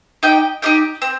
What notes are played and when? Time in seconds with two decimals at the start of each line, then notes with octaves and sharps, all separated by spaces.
0.23 D#4 G4 D#5 G5
0.62 D#4 G4 D#5 G5
1.02 C4